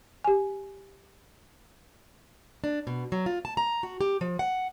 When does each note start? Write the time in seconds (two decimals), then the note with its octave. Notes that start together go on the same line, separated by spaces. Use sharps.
0.24 G4 G#5
2.64 D4
2.87 B2
3.12 F#3
3.26 F4
3.45 A5
3.57 A#5
3.83 F#4
4.01 G4
4.21 F3
4.39 F#5